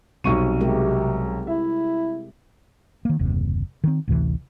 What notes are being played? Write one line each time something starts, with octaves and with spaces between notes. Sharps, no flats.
B1 C3 G3 C4 C#6 D#7
C3 G#3 G4 A#4
E4 E5
D#3 A#3
F#1 D#2 C3
D#3 C4
A1 D2 C3 E3